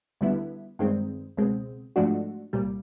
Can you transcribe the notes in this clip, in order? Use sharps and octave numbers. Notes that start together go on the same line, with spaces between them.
D2 D3 G3 B3 E4
G2 D#3 G#3 C4
C#2 B2 G#3 C4
G#2 F3 A3 D4 F#4
C2 A#2 G3